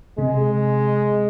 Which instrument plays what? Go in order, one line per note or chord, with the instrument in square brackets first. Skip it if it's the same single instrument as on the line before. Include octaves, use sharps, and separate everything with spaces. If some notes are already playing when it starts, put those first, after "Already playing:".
[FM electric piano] C3 [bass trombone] G#3